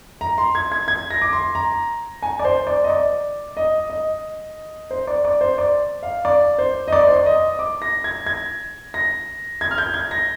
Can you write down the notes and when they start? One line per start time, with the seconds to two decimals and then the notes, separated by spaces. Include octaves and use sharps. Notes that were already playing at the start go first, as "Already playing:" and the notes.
0.21 A#5
0.38 C6
0.55 G#6
0.72 G#6
0.88 G#6
1.11 A#6
1.22 D6
1.33 C6
1.55 A#5
2.22 G#5
2.39 D5
2.45 C5
2.67 D5
2.84 D#5
2.90 D5
3.57 D#5
3.90 D#5
4.91 C5
5.07 D5
5.25 D5
5.41 C5
5.58 D5
6.03 F5
6.25 D5
6.59 C5
6.88 D#5
6.92 D5
7.07 C5
7.16 D5
7.26 D#5
7.59 D6
7.82 A#6
8.04 G#6
8.26 G#6
8.94 A#6
9.61 G#6
9.71 F6
9.78 G6
9.94 G#6
10.11 A#6